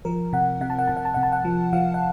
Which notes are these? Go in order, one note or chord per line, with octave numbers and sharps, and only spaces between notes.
F3 A#4
C3 F#5
C3 F#5
A5
F#5
C3 A5
F#5
A5
C3 F#5
A5
F#5
F3
F3 F5
F#5